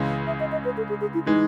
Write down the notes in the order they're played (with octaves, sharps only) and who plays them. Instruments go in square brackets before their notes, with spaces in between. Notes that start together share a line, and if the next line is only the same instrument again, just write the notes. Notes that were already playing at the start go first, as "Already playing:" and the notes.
Already playing: [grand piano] C#2 C#3 E3 G#3
[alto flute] E5
D#5
D#5
B4
A4
G#4
G#4
E4
[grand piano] E3 G#3 [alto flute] D#4